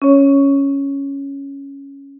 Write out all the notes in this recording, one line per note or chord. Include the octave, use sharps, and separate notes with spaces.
C#4 C#5